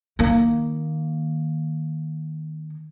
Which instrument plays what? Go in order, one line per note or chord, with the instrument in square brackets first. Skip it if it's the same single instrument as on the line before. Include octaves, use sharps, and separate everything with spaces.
[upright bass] D#3 A#3